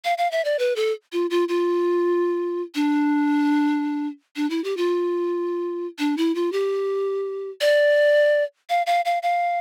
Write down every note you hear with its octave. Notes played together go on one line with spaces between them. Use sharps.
F5
F5
E5
D5
B4
A4
F4
F4
F4
D4
D4
E4
G4
F4
D4
E4
F4
G4
D5
F5
F5
F5
F5